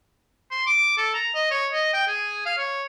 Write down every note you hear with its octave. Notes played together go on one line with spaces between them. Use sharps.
C6
D6
A4
A#5
D#5
C#5
D#5
G5
G#4
F5
C#5